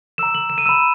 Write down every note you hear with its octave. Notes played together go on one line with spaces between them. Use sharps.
A#5 E6 E7
F#7
E7
D#7
B5 E6 E7